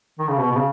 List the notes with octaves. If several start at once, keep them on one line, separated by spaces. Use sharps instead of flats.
D#3
C#3
B2
B2
C#3